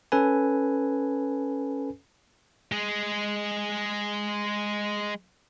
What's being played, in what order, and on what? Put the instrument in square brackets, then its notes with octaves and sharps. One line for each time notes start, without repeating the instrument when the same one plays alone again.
[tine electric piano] C#4 A4 B4 G#5
[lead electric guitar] G#3 G#4